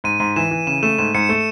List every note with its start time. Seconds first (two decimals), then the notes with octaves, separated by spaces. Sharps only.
0.04 G#2 D#7
0.20 G#2
0.36 E3 E7
0.51 E3
0.67 C#3 E7
0.83 A3 E7
0.98 G#2 E7
1.14 G#2 C#7
1.29 A3